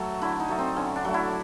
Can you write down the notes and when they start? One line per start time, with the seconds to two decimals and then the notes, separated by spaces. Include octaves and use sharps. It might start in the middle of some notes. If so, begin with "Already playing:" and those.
Already playing: F#3 A3
0.22 D3 E4
0.40 D#4
0.49 F#3 A3
0.59 C4
0.76 D3 C#4
0.96 D4
1.05 F#3 A3
1.14 E4